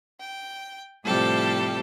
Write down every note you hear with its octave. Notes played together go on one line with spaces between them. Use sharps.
G5
A2 C3 F3 G3 A4 G5